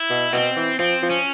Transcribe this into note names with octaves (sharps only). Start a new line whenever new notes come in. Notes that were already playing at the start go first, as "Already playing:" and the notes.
Already playing: E4
B2
B2 C4
E3
F3 C4
F3
C#4